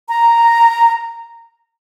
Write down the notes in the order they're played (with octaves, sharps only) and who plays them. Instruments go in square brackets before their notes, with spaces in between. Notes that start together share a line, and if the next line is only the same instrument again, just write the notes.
[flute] A#5